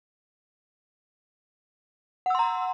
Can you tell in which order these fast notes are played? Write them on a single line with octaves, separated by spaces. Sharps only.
F#5 E6 C6 A#5